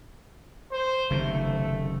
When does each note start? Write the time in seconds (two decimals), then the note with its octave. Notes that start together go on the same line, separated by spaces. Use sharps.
0.72 C5
1.10 F#1 C3 D#3 A3